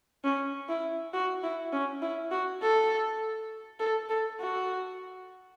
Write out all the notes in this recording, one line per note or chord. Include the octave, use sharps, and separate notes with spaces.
C#4
E4
F#4
E4
C#4
E4
F#4
A4
A4
A4
F#4